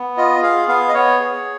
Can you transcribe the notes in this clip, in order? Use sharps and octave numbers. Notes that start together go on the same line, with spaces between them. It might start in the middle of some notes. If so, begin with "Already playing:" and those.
Already playing: B3
F4 D#5
G#4 F5
B3 F5
D#5
B3 C#5
G#4